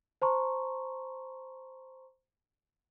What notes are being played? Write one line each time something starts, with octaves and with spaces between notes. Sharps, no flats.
C5 A5 A#5 C6 C#6